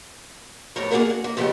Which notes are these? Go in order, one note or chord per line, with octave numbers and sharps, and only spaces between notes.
A2 C3 A#4 C#5 A#5
A#3 D4 D#4 F#4 G#4 A#4
F#5
A#3
F2 C#3 F3 G3 A3 G4